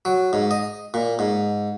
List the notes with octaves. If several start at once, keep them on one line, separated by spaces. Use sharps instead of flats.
F#3
G#2
D#5
A#2
G#2